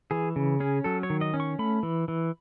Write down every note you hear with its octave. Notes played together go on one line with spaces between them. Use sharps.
E3 G#4
C#3
C#4 G#4
F#3 A4
C#5
D#3
D#5
C#4
C#6
A3 B5
E3
E3